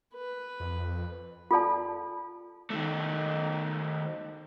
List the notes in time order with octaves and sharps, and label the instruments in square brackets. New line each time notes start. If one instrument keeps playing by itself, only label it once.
[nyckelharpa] B4
[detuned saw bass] F2
[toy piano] F4 A4 D5 A5
[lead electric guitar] D#3 A3